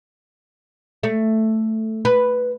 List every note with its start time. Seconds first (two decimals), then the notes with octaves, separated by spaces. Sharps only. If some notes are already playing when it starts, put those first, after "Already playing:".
1.03 A3
2.05 B4